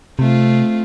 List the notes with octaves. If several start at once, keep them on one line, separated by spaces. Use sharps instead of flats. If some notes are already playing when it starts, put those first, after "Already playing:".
C3 A3 C4 F4